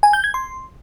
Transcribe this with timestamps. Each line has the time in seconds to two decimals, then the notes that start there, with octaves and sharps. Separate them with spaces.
0.03 G#5
0.13 G6
0.24 G#6
0.34 C6